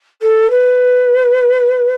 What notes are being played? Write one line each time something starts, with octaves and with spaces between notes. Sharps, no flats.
A4
B4